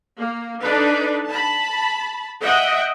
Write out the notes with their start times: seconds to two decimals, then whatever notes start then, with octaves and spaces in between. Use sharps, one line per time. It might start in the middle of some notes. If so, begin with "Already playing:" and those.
0.18 A#3
0.61 D4 D#4 A4 B4
1.27 A5 B5
2.42 D#5 E5 F#5 G5